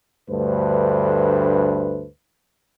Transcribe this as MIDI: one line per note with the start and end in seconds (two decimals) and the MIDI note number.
0.30 2.06 38
0.30 2.06 43
0.30 2.06 57
0.30 2.06 71
0.30 2.06 72